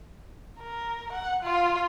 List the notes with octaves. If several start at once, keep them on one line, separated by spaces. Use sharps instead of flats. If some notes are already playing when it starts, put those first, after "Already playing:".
A#4
F#5
F4